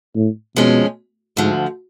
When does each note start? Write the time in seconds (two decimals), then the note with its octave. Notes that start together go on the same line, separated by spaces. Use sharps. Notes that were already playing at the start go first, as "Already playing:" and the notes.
0.16 A2
0.56 F2 B2 F3 G#3 C#4
1.37 D2 G#2 D3 F3